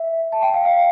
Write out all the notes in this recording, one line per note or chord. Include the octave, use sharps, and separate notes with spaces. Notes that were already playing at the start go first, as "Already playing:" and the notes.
Already playing: E5
A5
G5
F5
F5